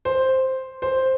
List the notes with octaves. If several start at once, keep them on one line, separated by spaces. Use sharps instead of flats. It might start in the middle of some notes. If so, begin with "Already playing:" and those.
C5
C5